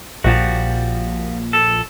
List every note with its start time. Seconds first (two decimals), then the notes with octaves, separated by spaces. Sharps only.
0.24 A#1 A#2 F3 G3 F#4
1.53 A4